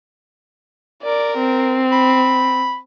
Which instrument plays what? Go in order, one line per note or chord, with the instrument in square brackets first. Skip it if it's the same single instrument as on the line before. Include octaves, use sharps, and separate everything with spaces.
[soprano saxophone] A#4 [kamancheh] D5
[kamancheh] C4
[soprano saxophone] B5